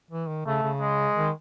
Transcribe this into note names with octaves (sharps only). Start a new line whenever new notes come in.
E3
D#3
C#3 A3
C#3
G#3
D#3